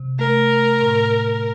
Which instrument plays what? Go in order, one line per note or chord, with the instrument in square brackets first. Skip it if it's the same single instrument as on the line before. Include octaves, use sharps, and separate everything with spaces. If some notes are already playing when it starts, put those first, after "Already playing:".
Already playing: [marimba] C3
[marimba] A3 [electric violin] A#4
[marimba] A3
A2